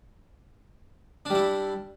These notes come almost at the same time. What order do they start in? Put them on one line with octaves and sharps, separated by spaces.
D4 G3 E4